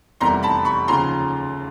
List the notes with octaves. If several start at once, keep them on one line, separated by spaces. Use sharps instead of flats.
F1 E2 C3 D#3 G3 A#5 C6
A5 B5
B5 C#6
D#2 C#3 F3 A#5 C6